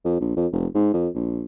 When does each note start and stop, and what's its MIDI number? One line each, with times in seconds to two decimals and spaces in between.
0.05 0.20 41
0.21 0.33 34
0.36 0.46 41
0.52 0.67 29
0.75 0.93 44
0.94 1.08 41
1.15 1.46 34